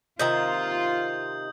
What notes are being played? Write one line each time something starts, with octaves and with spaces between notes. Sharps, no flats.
C3 D#3 F4 A#5 D#6 G6